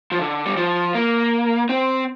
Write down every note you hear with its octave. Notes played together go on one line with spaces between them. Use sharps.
F3
D3
G3
F3
A#3
C4